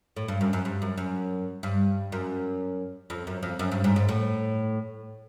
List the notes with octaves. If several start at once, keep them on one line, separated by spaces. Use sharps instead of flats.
A2
G2
F#2
F#2
G2
F#2
F#2
G2
F#2
F2
F#2
F2
F#2
G2
G#2
G#2
A2